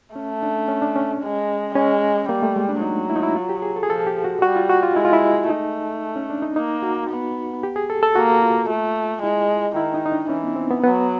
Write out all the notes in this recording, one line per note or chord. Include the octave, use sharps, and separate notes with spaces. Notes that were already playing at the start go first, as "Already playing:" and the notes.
A3 C#4
D4
C#4
D4
C#4
G#3
G#3 C#4
G3 A#3
A3
G#3
D4
F#3 D#4
E4
D#4
E4
F4
G4
G#4
A4
G#4
F3 A4
G4
F#4
G3 F#4
F4
F#4
F4
G#3 E4
F4
E4
A3 D#4
C#4
D4
D#4
A#3 D#4
F#4
B3
G4
G#4
A4
A4
A#3 F#4
F4
A3
G#3 E4
D#3 E4
D#4
D#4
D4
E3 C#4
B3
C4
B3
F#3 B3